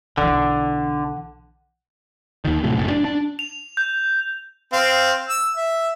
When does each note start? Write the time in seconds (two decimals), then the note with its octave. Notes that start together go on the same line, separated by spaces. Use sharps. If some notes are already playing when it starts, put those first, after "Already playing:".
0.18 B1 D3 E3 F#5
2.45 D#2 D#3
2.63 A2 C3 F#3
2.78 F#1 A2
2.90 D4
3.05 D4
3.39 F7
3.77 G6
4.73 C4 F5
5.29 E6
5.57 E5